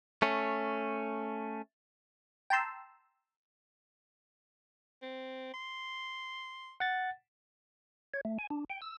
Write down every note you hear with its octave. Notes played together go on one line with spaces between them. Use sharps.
A3 C#4
G5 A5 A#5 C6 E6
C4
C6
F#5 A6
C#5
A3
G#5
D4
G5
E6